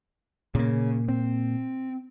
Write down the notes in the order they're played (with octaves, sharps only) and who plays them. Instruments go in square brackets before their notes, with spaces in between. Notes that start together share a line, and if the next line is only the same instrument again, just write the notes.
[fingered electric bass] A#2 A#3 [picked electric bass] C#3
[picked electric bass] C4